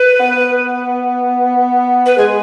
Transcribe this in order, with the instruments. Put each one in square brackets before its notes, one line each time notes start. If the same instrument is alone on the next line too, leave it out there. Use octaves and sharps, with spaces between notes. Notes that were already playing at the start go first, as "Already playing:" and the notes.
Already playing: [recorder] B4
[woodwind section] B3
[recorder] B4
[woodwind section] G#3 [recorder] G#4